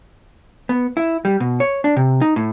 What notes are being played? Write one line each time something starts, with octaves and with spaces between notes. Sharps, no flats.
B3
E4
G3
B2
C#5
D4
C3
D#4
A2